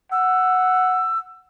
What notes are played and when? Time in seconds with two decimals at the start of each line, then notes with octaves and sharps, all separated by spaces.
0.12 F#5 E6